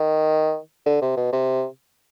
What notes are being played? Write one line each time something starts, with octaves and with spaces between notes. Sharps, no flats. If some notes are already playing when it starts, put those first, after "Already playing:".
Already playing: D#3
D3
C3
B2
C3